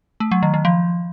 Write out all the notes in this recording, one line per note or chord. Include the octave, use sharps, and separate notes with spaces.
A3
F#3
D#3
D#3
F3